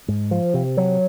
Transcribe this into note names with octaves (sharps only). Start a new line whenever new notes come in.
G#2
F3
C3
F#3